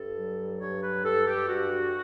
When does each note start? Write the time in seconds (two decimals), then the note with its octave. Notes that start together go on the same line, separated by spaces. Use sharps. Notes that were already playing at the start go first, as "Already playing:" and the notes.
Already playing: G2 A4
0.14 F#3
0.59 G2 C#5
0.81 B4
1.04 G2 A4
1.26 G4
1.48 G2 F#4